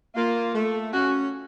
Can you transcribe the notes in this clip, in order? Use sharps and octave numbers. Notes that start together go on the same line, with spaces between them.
A#3 F4
A3
C#4 F#4